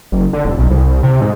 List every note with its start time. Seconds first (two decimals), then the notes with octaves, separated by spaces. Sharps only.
0.12 F#1
0.33 D3
0.45 D#1
0.58 B1
0.70 C2
1.03 C3
1.21 G#2